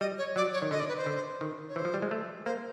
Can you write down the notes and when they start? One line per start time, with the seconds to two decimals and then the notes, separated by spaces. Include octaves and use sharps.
0.01 G3 D#5
0.18 C#5
0.36 F#3 D5
0.53 C#5
0.62 D#3
0.71 D3 D#5
0.80 D5
0.89 B4
0.97 C5
1.06 D3
1.41 D#3
1.69 C#5
1.76 E3 C5
1.85 F3
1.94 G3
2.02 G#3
2.11 A3
2.46 A#3 C5